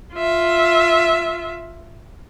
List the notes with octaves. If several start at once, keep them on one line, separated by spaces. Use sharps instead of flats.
F4 E5